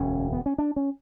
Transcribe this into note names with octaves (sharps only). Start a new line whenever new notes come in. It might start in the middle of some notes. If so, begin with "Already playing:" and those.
Already playing: E1 D2 D3 C#4
B3
C#4
D4
C#4